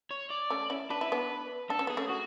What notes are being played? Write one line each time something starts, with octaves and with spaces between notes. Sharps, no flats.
C#5
D5
A3 C#4
C#4 E4
D4 B4
E4
B3 D4
D4 A4
C#4
B3 G#4
A3 C#4
F#4